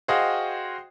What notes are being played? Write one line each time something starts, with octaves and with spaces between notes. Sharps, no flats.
F#4 G#4 C5 D#5 F5 G5